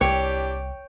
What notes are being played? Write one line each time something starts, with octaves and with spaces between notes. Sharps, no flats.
C2 E3 D4 G4 C#5 G5